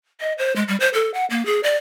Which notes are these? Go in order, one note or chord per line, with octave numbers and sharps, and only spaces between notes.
D#5
C5
G#3
G3
C5
A4
F#5
A#3
G#4
D5